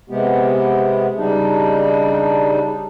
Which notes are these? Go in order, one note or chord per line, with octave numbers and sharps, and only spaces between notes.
C3 G#3 B3 G4
C#3 G3 D4 D#4